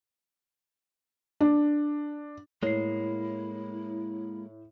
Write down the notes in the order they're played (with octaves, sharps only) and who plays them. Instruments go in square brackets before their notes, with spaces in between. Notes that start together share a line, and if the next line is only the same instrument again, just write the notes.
[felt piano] D4
[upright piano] A2 [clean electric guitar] G#3 A#3 [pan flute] E4 [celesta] C#5 C7